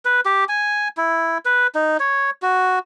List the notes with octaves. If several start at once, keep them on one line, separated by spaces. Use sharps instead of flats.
B4
G4
G#5
E4
B4
D#4
C#5
F#4